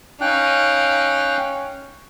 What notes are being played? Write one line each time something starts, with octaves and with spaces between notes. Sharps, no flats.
C#4 D#4 F5 G5 F#6